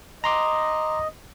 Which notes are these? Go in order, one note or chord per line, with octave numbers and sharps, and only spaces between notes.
D#5 A#5 C6 D6